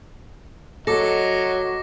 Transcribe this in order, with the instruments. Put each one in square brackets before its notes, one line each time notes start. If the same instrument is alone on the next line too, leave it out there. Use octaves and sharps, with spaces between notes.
[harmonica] F#3 [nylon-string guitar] A4 [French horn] D#5 [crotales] D6 A#6